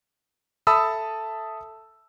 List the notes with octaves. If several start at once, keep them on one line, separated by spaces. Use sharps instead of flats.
A4 E5 A5 B5 D#6 E6